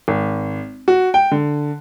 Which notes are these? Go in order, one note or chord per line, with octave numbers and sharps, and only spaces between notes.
G#1
F#4
G5
D3